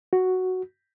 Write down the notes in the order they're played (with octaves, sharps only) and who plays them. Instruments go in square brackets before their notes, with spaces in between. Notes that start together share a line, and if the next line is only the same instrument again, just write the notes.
[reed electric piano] F#4